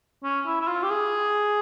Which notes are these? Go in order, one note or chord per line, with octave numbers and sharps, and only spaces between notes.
C#4
E4
E4
F4
G4
G#4